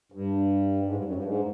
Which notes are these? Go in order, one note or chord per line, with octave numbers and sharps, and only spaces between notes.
G2
G#2
G2
F#2
G2
G#2